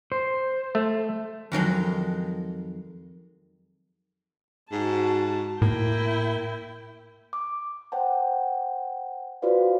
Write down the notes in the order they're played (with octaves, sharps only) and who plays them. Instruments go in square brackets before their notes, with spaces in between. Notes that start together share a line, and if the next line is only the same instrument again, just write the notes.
[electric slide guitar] C5
[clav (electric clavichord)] A3
[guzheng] F2 D#3 F#3 G#3
[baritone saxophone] G#2 [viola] F#4 A5
[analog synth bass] A2 [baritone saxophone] A#3 [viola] E4 G5
[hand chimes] D6
C5 F#5 G5 A5
F4 F#4 B4 C5 D5 F5